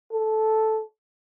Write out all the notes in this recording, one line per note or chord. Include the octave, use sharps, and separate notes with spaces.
A4